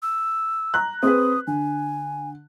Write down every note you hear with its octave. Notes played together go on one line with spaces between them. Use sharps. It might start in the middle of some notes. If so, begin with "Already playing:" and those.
E6
A#5 F#6
C4 G#4 B4 D#6
D3 G#5